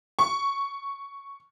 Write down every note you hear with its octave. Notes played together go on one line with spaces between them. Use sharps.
C#6